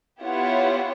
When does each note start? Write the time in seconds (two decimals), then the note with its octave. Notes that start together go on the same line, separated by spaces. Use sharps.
0.22 B3 E4 F4 G4 C#5 F#5